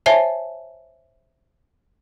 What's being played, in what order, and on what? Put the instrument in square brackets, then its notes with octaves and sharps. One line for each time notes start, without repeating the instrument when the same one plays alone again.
[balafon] C5 C#5 E5 G#5 A5